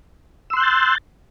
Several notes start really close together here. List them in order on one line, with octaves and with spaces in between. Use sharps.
E6 C6 F#6 G6 A6